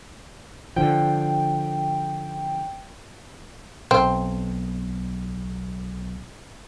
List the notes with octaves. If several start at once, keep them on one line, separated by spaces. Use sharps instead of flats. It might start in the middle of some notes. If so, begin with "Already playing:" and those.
D3 F3 G5
B1 C4